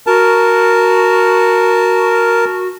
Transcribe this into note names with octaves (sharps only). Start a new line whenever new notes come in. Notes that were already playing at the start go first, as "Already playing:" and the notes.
F#4 A#4 A5